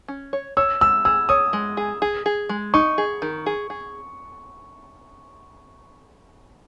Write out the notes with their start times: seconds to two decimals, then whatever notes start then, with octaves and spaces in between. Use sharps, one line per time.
0.08 C#4
0.33 C#5
0.57 C#5 E6
0.81 G#3 E6
1.05 G#4 E6
1.29 C#5 D#6
1.53 G#3
1.77 G#4
2.02 G#4
2.26 G#4
2.49 G#3
2.74 D#4 C#6
2.98 G#4
3.22 D#3
3.46 G#4
3.70 G#4